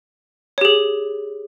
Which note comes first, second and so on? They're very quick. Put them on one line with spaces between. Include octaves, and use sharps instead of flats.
C#5 G4 G#4